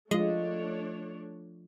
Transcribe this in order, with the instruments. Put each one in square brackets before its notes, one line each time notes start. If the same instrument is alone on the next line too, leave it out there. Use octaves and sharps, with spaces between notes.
[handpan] F3 F4 [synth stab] G#3 [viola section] A3 D4 C#5 [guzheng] D#5